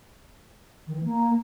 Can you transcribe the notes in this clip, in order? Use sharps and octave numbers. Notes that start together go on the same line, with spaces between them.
D#3
E3
A#3